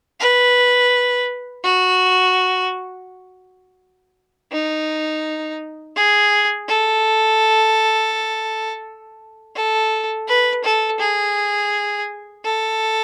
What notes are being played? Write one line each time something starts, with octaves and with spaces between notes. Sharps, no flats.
B4
F#4
D#4
G#4
A4
A4
B4
A4
G#4
A4